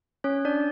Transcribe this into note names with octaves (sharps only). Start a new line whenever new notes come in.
C#4 C#5
D4 D5